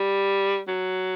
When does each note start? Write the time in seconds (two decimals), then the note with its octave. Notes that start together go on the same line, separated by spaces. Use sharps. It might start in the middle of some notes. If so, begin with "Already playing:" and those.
Already playing: G3
0.68 F#3